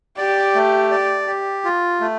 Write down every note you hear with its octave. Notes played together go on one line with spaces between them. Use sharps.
G4 D5
A3
D5
G4
F4
A3